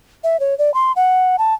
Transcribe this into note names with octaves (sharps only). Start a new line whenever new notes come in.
E5
C#5
D5
C6
F#5
A5